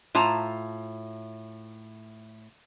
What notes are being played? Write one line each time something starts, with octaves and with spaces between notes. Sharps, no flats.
A2 F4 A5 A#5